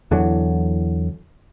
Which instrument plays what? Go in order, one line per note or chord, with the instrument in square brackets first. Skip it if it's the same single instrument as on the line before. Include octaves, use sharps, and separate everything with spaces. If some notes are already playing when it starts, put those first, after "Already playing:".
[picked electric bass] E2 D3 E3 F#3